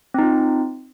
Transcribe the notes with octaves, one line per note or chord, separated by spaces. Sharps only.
C4 D#4 F4